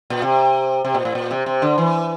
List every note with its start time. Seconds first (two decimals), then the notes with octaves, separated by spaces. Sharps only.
0.10 A#2
0.22 C3
0.85 C3
0.95 A#2
1.05 A2
1.15 A#2
1.31 C3
1.46 C3
1.62 D3
1.78 E3